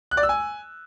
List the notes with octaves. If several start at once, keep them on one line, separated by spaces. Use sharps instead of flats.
F#6
D5
E6
G#5